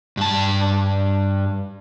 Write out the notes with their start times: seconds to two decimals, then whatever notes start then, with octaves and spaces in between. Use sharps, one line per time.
0.17 G2 A5